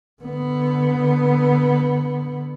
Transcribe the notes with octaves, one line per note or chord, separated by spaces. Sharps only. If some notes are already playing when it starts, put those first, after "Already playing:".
D3 B3